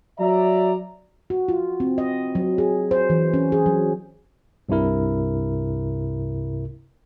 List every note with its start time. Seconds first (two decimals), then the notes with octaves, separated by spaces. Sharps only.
0.19 F#3 D5 E5 A#5
1.30 F#4
1.48 F4
1.80 C4
1.98 D#5
2.35 F#3
2.58 G#4
2.91 C5
3.10 E3
3.33 C#4
3.52 G#4
3.66 F#3
4.69 C2 G2 C3 E4 A#4